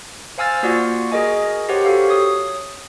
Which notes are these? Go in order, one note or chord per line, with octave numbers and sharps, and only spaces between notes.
C5 F5 G#5 E6 F6 A6
A#3 F4 F#4 D5 F#5
F#4 G#4 A#4 D#5 G#5
G4 A#4 C5 C#5 F#5
F#4 G4 A4 F5
C#5 D#6